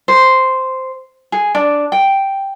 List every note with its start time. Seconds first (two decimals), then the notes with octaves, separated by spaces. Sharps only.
0.08 C5
1.32 G#4
1.55 D4
1.92 G5